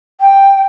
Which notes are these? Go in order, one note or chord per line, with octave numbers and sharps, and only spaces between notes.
G5